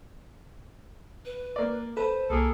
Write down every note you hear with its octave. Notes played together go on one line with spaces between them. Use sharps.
B4
A#3 D5
A4 B4 C5
C2 A#3 G#4 A4